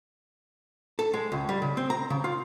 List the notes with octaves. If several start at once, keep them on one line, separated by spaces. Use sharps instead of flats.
A4
G#3
C#2
G3
C#3
C4
A#5
C#3
F4